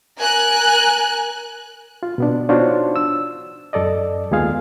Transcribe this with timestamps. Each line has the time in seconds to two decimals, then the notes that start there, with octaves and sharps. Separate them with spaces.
0.18 A#4 G#5 F#6
2.03 F4
2.18 B2 B3 D4
2.49 D4 D#4 F4 F#4 C5 C#5
2.96 E6
3.73 F#2 A4 D5 D#5
4.31 D#2 G#3 B3 F4 G#4 F5